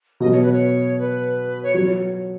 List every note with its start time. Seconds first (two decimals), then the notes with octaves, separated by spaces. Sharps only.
0.20 B2 F#3 B3 F#4 D#5
0.32 C#5
0.41 B4
0.53 C#5
0.98 B4
1.62 C#5
1.74 F#3 C#5